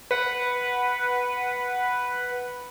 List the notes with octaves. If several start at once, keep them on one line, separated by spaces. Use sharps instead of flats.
B4 F#5